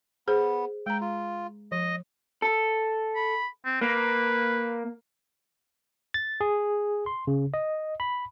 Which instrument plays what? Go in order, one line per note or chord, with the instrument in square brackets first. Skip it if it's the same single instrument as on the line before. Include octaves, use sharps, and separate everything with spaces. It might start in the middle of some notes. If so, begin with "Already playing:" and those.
[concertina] B3 [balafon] G#4 C5
[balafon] G#3 A#5 [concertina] G5
[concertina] F4
[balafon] F3 [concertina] D#5
[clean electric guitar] A4
[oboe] B5
C4
[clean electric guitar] A#3 [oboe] B4
[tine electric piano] A6
G#4
C6
C#3
D#5
B5